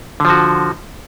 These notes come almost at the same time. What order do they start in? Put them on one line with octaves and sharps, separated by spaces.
D3 F3 F#4